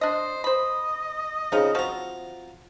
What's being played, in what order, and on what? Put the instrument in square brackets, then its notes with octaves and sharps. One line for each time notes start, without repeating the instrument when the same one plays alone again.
[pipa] D4 D#5 [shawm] C5
[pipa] C5 B5 [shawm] D#5
[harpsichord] C#3 [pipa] C4 D#4 F4
[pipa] F3 C4 F#4 [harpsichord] F4 A#5